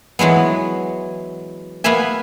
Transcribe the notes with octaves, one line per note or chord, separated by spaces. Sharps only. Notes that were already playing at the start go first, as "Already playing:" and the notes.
E3 F#3 G#3 B3
A#3 B3 B4 E5 G#5